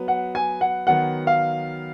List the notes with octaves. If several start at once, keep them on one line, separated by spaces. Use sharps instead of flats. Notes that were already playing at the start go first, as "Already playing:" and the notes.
Already playing: F#3 B3 B4
F#5
G#5
F#5
D#3 F#3 B3 F#5
F5